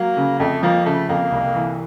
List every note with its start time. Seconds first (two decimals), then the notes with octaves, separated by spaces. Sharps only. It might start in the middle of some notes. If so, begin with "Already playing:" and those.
Already playing: F#3 A#3
0.17 C#3
0.39 F2 A3
0.63 F3 A#3
0.86 C#3 A3
1.09 F2 A#3
1.32 C2
1.55 E3